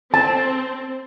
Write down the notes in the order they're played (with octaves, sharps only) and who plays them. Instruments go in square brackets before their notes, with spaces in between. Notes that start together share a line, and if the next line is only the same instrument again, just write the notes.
[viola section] C4 [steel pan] A5